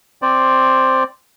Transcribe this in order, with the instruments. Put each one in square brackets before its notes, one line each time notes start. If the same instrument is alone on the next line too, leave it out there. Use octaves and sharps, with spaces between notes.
[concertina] C4 C5 D5